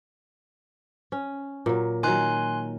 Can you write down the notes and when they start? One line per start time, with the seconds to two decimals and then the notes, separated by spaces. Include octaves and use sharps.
1.12 C#4
1.66 A#2 F#3
2.03 D#3 F#3 G#5 C6 F#6